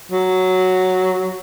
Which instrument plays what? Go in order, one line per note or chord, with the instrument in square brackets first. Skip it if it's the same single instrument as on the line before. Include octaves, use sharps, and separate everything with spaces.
[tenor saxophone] F#3